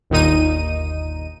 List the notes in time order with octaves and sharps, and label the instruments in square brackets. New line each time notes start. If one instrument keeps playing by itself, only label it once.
[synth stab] G1 D#2 A#2 D#4 D#7